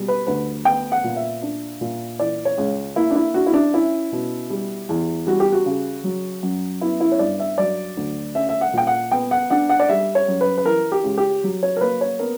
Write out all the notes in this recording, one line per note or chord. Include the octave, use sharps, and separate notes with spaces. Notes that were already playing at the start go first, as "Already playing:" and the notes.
Already playing: B2 G3
B4
D2 B4
B3 G5
F#5
A#2
E5
D4
A#2
E3 D5
C#5
C#2
A#3 E4
D4
E4
D4 F#4
E4
D4
C#4 E4
B2
G3
E2
G3 F#4
G4
F#4
C#3
F#3
F#2
B3 E4
E4
C#5
G2 D5
E5
F#3 D5
D2
C#4 E5
E5
F#5
A#2 G5
F#5
B3 G5
F#5
D4 F#5
F#5
D5
G3 E5
C#5
F#2
B4
B4
E3 A#4
G4
C#2
G4
F#3
C#5
A#4
A#3 B4
C#5
B3 A#4